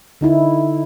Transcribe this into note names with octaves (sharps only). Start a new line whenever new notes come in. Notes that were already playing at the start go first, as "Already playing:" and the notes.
D3 D#4 E4